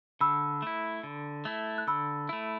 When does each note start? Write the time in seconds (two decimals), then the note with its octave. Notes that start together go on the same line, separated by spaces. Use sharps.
0.21 D3 B5 E6
0.62 A3 E4
1.03 D3
1.45 A3 E4
1.78 F#6
1.87 D3 B5 E6
2.29 A3 E4